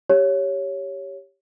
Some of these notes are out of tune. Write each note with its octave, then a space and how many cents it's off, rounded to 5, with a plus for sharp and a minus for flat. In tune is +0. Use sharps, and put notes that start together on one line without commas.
G4 +0 C#5 +0